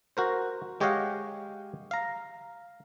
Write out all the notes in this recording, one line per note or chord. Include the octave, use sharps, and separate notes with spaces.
F#4 A#4 C5
G#3 G4 C#5 D#5 F5 F#5
F5 A#5